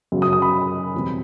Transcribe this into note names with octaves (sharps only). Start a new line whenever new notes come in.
F#2 C#3 F#3
D#6
D#6
B5
E2 B2 G3 C4